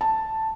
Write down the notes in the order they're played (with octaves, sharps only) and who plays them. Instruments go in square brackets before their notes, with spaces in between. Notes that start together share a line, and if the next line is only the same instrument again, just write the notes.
[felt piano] A5